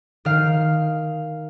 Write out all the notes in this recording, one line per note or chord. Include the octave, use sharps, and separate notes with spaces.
D#3 F5